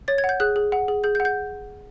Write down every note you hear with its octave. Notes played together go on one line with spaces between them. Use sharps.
C#5 A6
G#6
F#5
G6
G#4 F#6
G#4
F#5
G#4
G#4 G6
G6
F#5
G6